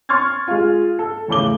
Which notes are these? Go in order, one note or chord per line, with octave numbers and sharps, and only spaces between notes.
C6 C#6 F6 G#6 A6
G#3 F4
A4
E2 C#3 A3 D6 G7